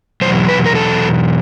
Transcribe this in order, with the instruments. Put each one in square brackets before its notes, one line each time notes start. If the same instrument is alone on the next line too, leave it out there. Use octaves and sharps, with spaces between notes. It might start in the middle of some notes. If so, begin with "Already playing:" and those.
[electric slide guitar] E2 B2 F#3 C5
B4
A#4
A4